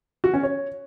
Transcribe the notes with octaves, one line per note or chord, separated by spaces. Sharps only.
F#4
C#4
C#5